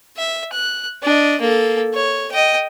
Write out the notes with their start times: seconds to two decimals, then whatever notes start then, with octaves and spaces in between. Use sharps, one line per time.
0.17 E5
0.53 F#6
1.02 D4 D#5
1.41 A#3 A4
1.94 C#5
2.32 D#5 G5